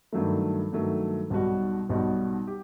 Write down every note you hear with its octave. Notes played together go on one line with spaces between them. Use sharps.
G2 D#3 F#3 A3
G2 D#3 F#3 A3
B1 B2 G3 D#4 F#4
B1 B2 G3 D#4 F#4
G4